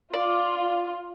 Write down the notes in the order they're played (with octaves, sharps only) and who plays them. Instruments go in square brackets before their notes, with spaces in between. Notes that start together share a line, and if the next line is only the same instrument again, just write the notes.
[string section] F4 [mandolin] D5